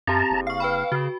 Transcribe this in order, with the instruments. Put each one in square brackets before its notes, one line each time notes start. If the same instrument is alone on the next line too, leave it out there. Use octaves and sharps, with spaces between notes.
[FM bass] F#2 [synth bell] C4 G4 [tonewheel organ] A5 A#5
[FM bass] F#1
[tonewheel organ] F5 [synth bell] C#6 C7
[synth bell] B4 G5 B5
[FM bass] C#3 [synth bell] F#4